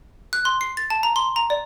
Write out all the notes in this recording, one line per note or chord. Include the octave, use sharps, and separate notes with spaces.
F#6
C6
C7
A6
A5
A#5
C6
A#5
D5